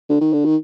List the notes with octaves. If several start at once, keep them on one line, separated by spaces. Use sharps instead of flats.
D3
D#3
D3
D#3